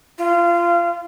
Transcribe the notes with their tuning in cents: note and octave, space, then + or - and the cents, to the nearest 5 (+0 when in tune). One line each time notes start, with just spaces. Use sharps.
F4 -25